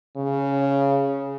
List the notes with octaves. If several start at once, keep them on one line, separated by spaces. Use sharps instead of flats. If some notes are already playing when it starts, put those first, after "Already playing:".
C#3